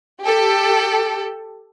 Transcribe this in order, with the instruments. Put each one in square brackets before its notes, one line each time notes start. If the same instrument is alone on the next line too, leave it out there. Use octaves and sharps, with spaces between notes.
[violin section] G4 A4